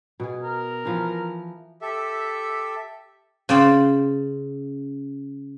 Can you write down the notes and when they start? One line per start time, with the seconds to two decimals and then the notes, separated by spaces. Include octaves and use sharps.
0.20 B2 G#4
0.43 A#4
0.85 E3 F3
1.82 G4 A4 E5
3.49 C#3 C5 D5 G5